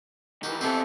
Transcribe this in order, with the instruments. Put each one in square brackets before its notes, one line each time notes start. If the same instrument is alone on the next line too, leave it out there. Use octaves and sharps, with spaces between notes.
[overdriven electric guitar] D#3 E3 [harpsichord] F#4 G4
[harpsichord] E3 B3 G4 [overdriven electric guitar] C4 A4